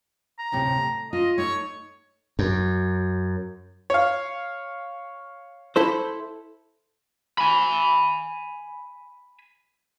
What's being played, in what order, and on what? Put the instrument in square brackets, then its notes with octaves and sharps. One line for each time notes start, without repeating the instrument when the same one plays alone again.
[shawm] A#5
[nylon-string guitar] D2 A2 C3
A3
[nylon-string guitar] F4 [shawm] D#5
[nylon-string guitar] A3 D#4 [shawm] C#5
[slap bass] F#2
[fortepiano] C#5 F5
[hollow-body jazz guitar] E4 A4 C5
[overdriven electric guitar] G#5 B5